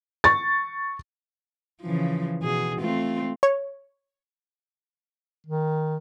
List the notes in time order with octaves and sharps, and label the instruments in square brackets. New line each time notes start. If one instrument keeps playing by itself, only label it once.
[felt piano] C#6 A6
[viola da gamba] C#3 E3 F3
B2 G#4
A3 C4 F4
[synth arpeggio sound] C#5
[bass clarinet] D#3